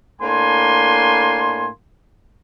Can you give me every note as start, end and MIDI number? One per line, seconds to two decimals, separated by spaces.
0.21 1.68 45
0.21 1.68 58
0.21 1.68 62
0.21 1.68 80
0.21 1.68 83
0.21 1.68 84